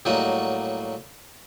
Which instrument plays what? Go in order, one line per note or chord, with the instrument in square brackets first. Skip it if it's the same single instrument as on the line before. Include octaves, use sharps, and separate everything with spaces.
[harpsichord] A2 F#3 G3 A#3 F#4 D#5